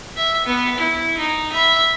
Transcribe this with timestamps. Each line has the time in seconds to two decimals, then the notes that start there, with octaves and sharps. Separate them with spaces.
0.16 E5
0.46 B3
0.78 E4
1.17 D#4
1.53 E5 B5